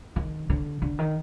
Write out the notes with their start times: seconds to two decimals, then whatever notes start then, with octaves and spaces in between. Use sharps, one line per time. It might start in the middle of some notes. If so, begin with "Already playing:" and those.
0.16 D#3
0.50 D3
0.82 D3
0.99 D#3